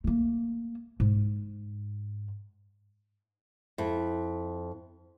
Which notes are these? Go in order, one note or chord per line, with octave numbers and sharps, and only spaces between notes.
A3 A#3
G#2
F2 E4